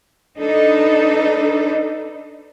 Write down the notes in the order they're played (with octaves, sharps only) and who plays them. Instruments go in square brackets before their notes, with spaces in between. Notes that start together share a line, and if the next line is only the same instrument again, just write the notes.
[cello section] D4 D#4 A4 B4